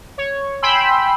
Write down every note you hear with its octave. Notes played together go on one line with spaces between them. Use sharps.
C#5
G5 G#5 B5 C6 E6